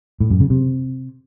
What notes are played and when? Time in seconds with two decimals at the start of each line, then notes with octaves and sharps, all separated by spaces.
0.20 A2
0.30 F#2
0.40 C#3
0.50 C3